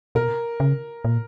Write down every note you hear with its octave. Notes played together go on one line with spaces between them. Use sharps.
B2 A#4
C#3
A#2